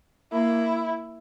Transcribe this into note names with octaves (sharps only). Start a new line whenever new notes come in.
A#3 E4